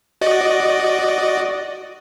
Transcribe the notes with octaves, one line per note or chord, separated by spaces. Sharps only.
F#4 D5 D#5